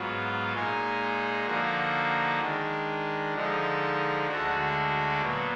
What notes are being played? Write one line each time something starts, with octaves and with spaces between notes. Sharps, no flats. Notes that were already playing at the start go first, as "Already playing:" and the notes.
Already playing: G#2 F#3 B3 F4
A#2 G#3 D#4 G#4
D3 F3 A#3 D#4 F#4
D#3 G#3 D4
D3 F3 G#3 D#4
D2 D3 G#3 D4 F#4
A#2 F#3 B3